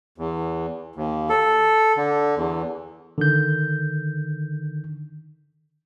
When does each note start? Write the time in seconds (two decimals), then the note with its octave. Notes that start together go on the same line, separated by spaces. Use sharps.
0.18 E2
0.96 D#2
1.29 A4
1.97 D3
2.37 E2
3.18 D3 D#3 G6